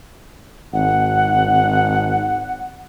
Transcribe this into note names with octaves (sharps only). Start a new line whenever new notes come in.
G#1 F#5